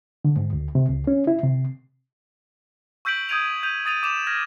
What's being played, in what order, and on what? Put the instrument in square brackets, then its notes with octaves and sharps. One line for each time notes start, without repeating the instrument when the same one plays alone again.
[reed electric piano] D3
G#2
D2
C3
C#2
C#4
E4
C3
[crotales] C#6 E6 G6 B6 D7 F#7
D#6 G6 G#6 D7 D#7 F7
G6 D#7 F7
D#6 A6 D#7 F7
D6 E7 F7
F6 G#6 A#6